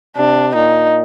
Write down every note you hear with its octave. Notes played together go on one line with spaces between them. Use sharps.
C3 D4
A#2 D#4